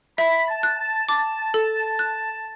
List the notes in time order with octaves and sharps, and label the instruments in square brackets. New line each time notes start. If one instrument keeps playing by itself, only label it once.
[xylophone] E5 [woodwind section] B5
[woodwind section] A5
[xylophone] F#6
[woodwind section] A5
[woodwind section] A5 [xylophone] D6
[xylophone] A4
F#6